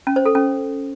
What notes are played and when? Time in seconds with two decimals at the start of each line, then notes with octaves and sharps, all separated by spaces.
0.07 C#4
0.16 C5
0.26 A4
0.35 C#4